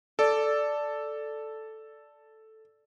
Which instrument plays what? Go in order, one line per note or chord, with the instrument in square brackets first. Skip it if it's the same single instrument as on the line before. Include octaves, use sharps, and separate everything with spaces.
[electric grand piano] A4 [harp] D5